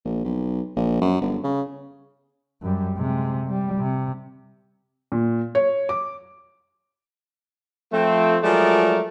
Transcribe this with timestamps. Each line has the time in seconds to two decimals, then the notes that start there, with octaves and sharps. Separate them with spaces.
0.05 A#1
0.24 B1
0.76 A#1
1.02 F#2
1.21 G1
1.43 C#3
2.62 F#2 G3
2.97 C3 G#3
3.48 G3
3.79 C3
5.12 A#2
5.55 C#5
5.89 D6
7.93 F3 A3 C4
8.43 F3 F#3 G#3 A3 A#4 D5